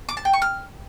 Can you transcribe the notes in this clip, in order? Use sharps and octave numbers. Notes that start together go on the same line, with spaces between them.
D6
A5
G5
C#6
F6